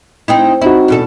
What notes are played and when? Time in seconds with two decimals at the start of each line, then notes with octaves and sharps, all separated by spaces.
0.28 C4 D#4 E4
0.62 C4 D#4 E4 F#4
0.88 E2 B2 A4